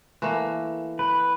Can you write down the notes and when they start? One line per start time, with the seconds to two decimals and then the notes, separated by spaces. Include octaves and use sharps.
0.22 E3 A3 A#3
0.99 B4